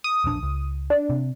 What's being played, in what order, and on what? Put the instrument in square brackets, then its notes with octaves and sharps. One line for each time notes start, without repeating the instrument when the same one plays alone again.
[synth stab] D#6
[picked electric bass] E1 A#1 D4
C#2
[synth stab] D4
[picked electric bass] C3